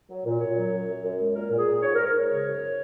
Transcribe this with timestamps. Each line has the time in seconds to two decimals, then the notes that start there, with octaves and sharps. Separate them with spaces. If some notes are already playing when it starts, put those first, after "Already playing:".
0.09 F#3
0.25 A#2
0.40 F#2 C#5
0.57 F#3
0.72 F#2
0.88 F#2
1.04 F#2
1.20 G#3
1.35 A#2 A#4
1.51 A#2
1.58 G#4
1.67 A#2
1.82 G#2 C#5
1.95 A#4
1.98 G#2
2.06 A#4
2.14 G#2 C#5
2.29 C#3 C#5
2.45 F#2